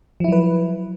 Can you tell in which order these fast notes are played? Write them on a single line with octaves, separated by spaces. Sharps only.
F3 E4 F#3 B4